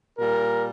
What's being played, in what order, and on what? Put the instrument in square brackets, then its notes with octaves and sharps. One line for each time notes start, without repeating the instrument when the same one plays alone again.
[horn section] A#2 G3 A#4